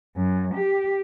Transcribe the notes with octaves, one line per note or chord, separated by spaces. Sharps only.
F#2
G4